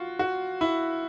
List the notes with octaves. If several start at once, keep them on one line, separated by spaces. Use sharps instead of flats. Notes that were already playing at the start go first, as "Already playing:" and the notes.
Already playing: F4 F#4
F#4
E4